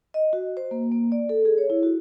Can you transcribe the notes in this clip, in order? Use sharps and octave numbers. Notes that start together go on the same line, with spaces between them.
D#5
F#4
C5
A#3
A#3
D5
A4
G#4
C#5
E4
F#4